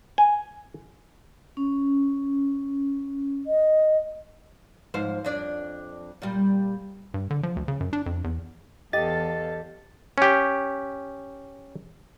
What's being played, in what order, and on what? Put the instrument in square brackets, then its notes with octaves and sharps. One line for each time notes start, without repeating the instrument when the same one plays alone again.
[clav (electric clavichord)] G#5
[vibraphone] C#4
[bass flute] D#5
[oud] G#2 F3 C5
F2 D4 D5
A#2 G3
[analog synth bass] G2
D3
F3
D2
C#3
F#2
D4
F2
E2
[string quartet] E2 A4 F5 [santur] G4 [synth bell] D#5 [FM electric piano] A6
[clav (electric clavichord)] C#4 G4